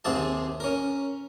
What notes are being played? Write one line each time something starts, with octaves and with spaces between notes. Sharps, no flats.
D#2 C3 C4 G#4 A5
C#4 A#4